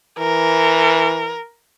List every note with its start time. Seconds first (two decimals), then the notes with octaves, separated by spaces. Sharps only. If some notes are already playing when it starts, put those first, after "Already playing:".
0.19 E3 A#4